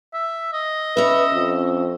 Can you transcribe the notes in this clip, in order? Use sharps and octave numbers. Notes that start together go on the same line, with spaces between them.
E5
D#5
C#4 B4 E5
F2